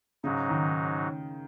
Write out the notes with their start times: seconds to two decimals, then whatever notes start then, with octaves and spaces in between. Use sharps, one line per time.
0.24 G#2 C#3 F#3 D#4
0.50 D#3